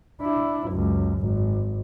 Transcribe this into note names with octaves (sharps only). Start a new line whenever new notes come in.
D4 E4
C#2 F#2
G#1